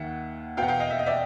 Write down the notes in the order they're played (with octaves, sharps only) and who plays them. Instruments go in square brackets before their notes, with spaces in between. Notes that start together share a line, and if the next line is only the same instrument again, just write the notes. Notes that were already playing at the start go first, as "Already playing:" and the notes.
Already playing: [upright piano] D#2 D#3 E5 F#5
B2 F5 G5
E2 F#5
F5 G5
D#5 F5
E5
D#5
D5 E5